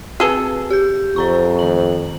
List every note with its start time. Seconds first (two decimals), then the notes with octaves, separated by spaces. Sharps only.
0.20 C4 G#4 A4 B4
0.70 G4 G6
1.16 F2 C5 A#5 C#6
1.59 D#3 F#7